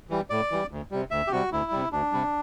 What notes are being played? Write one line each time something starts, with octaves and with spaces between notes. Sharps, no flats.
E3 G3
A2 D5
E3 G3
D2
C3 G3
D2 E5
G4
C3 G3 F#4
D2 E4
C3 G3
D2 D4
C3 G3